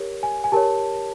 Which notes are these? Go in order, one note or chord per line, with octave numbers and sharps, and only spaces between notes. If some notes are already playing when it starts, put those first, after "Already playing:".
Already playing: G4 A#4 C#5
G#5
G#5
G4 A#4 C#5 A5